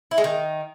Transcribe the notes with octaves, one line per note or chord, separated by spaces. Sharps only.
E4
G#3
D#3